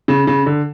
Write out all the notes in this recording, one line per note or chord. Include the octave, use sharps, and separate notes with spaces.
C#3
C#3
D3